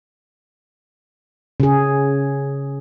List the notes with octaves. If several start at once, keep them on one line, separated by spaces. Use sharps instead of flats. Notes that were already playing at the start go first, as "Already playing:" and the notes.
C#3 G#4